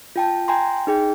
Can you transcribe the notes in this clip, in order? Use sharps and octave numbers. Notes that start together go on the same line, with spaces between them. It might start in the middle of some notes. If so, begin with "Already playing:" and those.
F4 G5 A5
G5 G#5 A#5 C6
D#4 G#4 G5